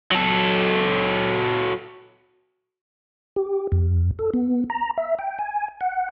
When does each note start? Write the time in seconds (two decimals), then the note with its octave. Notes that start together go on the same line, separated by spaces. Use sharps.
0.11 F#3 A4
3.36 G4
3.72 F2
4.19 A4
4.34 B3
4.70 A#5
4.97 E5
5.19 G5
5.39 G#5
5.81 F#5